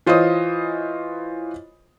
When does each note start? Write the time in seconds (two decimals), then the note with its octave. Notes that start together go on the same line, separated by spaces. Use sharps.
0.06 E3 F4 C5 C#5 D#5 D#6